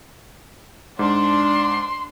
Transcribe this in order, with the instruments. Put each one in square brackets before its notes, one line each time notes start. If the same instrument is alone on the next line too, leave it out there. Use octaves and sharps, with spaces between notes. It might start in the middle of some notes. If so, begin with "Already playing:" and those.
[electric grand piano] G#2 [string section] D4 [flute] C6